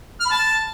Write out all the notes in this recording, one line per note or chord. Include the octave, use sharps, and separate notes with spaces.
F6
B5
A5